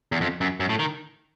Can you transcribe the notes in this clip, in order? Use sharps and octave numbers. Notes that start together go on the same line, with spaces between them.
E2
F2
F#2
F#2
A2
D#3